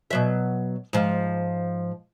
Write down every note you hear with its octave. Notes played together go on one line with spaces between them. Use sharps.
B2 F#3 E5
G#2 F3